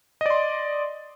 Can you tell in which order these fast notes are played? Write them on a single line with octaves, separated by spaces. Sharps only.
D#5 D5 C6